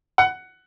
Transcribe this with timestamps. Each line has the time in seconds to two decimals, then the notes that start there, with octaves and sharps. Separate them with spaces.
0.18 F#5